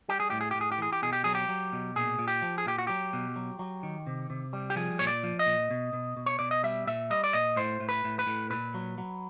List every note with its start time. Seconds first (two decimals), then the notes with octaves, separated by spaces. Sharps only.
0.09 G3 G4
0.20 G#4
0.30 A2 G4
0.41 G#4
0.51 A2 G4
0.61 G#4
0.72 G4
0.78 E3 G#4
0.93 G4
1.02 B2 G#4
1.13 G4
1.24 F#3 G#4
1.35 G4
1.49 F#3
1.73 B2
1.96 A#2 G#4
2.19 A#2
2.28 G4
2.42 F3
2.58 G#4
2.66 A#2 G4
2.78 F#4
2.87 F#3 G4
3.13 B2
3.36 F#3
3.59 F#3
3.83 D#3
4.07 C3
4.30 C3
4.53 G3
4.70 G4
4.76 F3 G#4
4.99 A#2 C#5
5.07 D5
5.23 F3
5.39 D#5
5.46 A#2
5.71 B2
5.93 B2
6.17 B2
6.26 C#5
6.39 B2 D5
6.51 D#5
6.63 G3 E5
6.87 A#2 E5
7.10 G3 D#5
7.24 D5
7.33 A#2 D#5
7.56 A2 C5
7.80 A2
7.89 B4
8.04 A2
8.19 B4
8.27 A2
8.50 A#2 B4
8.74 F#3
8.98 F#3